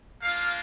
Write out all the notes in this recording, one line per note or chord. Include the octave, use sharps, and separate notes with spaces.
A#3 D4 F4 F5